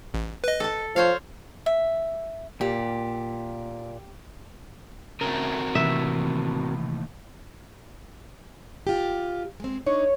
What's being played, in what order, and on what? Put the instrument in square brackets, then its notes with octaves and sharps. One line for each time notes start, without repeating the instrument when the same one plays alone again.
[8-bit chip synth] A1
B4 D#5
[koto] A4 A5
[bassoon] F3 [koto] C5 C#5 F5
[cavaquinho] E5
[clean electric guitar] A#2 [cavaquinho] G4
[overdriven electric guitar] C#3 A3 [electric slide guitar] C4 F#4 A#4
[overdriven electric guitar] D#2 A2 [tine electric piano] C3 E3 [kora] E5
[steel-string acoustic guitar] F4 G4
G#3 C4
[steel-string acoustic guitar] D4 D#4 [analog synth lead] C#5